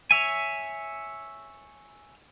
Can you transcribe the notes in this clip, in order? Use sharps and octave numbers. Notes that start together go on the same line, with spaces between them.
C#5 E5 G#5